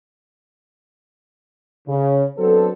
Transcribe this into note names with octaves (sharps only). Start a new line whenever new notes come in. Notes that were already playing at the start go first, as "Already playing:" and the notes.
C#3
F#3 B3 C4 D4 A4